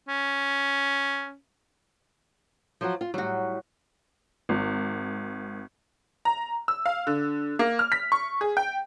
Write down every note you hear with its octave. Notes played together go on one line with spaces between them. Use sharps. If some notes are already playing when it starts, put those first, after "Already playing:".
C#4
F3 F#3 F#4
F4
A2 F#3 G3 F#4
G#1
A#5
E6
F5
D3
A#3
F6
B6
C#6
G#4
G5